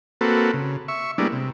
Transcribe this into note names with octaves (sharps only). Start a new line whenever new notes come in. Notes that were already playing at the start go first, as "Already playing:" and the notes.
A#3 C4 F#4 A4 B4
C#3
E5 C#6
G3 G#3 A#3 B3 D4 E4
C3